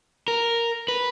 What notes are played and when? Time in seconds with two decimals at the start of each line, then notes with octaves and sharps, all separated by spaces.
0.28 A#4
0.88 B4